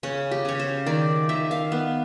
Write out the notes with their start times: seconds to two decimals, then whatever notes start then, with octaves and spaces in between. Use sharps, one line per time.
0.03 C#3 C#4
0.31 G4
0.45 C#3 C#5
0.59 C5
0.86 D#3 D5
1.29 D#3 E5
1.51 F5
1.72 B3